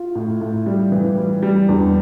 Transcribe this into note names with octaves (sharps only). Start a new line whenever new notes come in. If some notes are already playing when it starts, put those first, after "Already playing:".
Already playing: F4
A2
A2
G3
E3
G3
G3
E2 D4